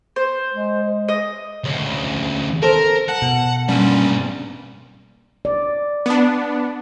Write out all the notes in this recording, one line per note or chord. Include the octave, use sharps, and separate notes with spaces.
C5
G#3
D#5
D2 C#3
A4 A#4 C5
F#5 A5
B2
G2 A#2 G3 C#4
D5
B3 D4